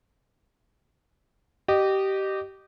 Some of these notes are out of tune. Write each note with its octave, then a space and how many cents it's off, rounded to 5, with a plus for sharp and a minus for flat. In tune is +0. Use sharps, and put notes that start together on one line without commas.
G4 -20 D#5 -25